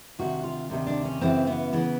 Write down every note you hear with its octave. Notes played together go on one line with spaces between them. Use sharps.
D2 C3 D#3 F#4
F4
D2 C3 D#3
D4
C#4
F#2 C#3 E3 C4
B3
C#3 E3 B3